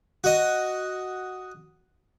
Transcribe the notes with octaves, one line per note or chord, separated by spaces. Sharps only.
F#4 D#5